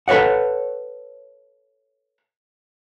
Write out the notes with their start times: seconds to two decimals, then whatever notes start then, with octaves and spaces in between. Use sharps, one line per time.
0.08 A4 B4 C#5 D5 F#5